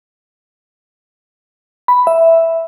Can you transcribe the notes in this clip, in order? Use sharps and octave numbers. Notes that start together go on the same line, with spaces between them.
B5
E5